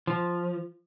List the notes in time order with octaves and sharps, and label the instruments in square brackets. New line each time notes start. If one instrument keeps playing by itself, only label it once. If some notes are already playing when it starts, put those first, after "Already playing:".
[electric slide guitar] F3